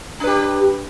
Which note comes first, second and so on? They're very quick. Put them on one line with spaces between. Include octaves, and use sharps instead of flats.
D4 B4 G4